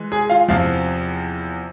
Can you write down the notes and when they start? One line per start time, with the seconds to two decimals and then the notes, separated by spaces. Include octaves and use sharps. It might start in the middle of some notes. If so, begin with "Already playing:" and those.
Already playing: E3 G#3
0.12 G#4 G#5
0.30 F4 F5
0.48 E2 C3 F3 F4 F5